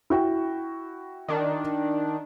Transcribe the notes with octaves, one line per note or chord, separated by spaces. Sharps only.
E4 F#4 G5
D#3 D4